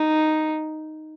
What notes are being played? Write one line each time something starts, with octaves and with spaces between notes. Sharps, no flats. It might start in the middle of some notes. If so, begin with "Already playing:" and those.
Already playing: D#4